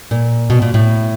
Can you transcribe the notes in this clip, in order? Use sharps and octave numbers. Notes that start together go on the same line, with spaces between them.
A#2
B2
A#2
A2